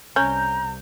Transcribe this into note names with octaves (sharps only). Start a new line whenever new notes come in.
C2 C#4 A#5 G6